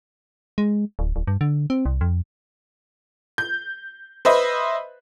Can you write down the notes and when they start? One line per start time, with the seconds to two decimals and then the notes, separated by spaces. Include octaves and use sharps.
0.58 G#3
0.99 D1
1.16 D1
1.27 G2
1.41 D3
1.70 C4
1.86 C2
2.01 F2
3.38 G6
4.25 B4 C5 D#5 E5 B5